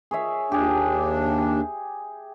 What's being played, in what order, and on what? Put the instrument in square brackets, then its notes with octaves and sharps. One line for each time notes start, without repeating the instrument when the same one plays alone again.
[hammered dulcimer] G#4 C#5 E5
[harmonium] D#2 D4 [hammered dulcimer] G4 G#4